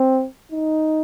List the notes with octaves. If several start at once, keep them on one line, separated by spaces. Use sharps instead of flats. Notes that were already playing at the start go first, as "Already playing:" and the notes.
Already playing: C4
D#4